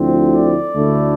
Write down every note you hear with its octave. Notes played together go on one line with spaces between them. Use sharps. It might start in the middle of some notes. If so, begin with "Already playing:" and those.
Already playing: D2 D3 F3 C4 E4
D5
D2 D3 A3 E4